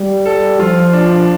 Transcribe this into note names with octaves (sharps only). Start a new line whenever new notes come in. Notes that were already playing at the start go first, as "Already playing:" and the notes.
Already playing: G3
A4
F3 F4
D4
D4